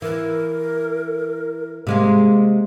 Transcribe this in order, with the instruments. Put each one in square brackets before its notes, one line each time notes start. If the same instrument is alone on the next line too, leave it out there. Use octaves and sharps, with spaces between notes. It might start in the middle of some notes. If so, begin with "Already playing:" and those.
[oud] E3 [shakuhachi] A#4
[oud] C3 G#3 A#3